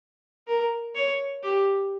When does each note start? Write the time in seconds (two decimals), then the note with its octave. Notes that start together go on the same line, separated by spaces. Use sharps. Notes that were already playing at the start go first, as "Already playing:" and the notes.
0.47 A#4
0.95 C#5
1.44 G4